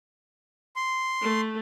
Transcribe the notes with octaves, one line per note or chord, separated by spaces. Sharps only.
C6
A3